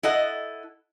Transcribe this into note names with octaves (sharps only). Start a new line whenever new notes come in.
E4 A4 D#5 F#5